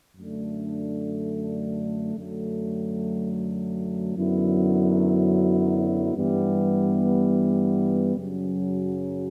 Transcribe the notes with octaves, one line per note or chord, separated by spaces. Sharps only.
F#2 D3 A3 D4
F#2 D3 F#3 A3
F#2 D3 F#3 B3 E4
G2 E3 G3 B3
F#2 C#3 F#3 C#4